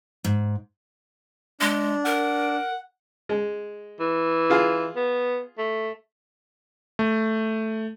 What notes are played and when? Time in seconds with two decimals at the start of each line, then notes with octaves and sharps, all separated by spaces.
0.24 G#2
1.61 G#3 D4
2.05 A#4 F#5
3.29 G#3
4.00 E3
4.50 F4 G#4
4.96 B3
5.58 A3
6.99 A3